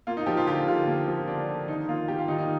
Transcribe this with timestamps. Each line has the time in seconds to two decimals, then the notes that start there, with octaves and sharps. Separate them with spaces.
0.07 A#3 F4
0.17 D#4
0.26 F3 G4
0.37 F4
0.47 D3 G4
0.67 D3 F4
0.87 A#3
1.08 F3
1.27 D3 D4
1.48 D3
1.68 D#3 D#4
1.88 A#3 F4
2.08 A#3 G4
2.19 F4
2.28 D#3 D#4
2.38 D#4